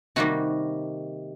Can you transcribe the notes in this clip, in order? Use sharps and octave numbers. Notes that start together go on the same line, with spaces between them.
C3 D#3 G3 A#3 F#4